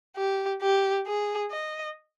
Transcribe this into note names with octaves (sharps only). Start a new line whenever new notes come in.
G4
G4
G#4
D#5